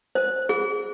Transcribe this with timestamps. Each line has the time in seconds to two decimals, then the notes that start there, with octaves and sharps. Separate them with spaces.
0.15 C5
0.49 G#4